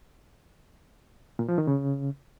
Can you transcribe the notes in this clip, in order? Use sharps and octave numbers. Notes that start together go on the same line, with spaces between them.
A#2
F3
D#3
C#3